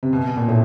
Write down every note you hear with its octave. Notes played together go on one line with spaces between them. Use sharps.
C3
B2
B2
A#2
A2